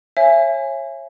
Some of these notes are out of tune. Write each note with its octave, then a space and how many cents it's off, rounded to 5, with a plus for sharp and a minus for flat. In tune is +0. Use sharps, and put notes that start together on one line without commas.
C#5 -30 E5 +30 G#5 +0